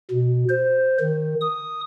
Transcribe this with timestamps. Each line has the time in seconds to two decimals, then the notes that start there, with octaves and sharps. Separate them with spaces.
0.11 B2
0.49 C5
1.00 D#3
1.41 D#6